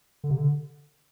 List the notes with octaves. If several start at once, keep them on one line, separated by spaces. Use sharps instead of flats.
D3
C3
D3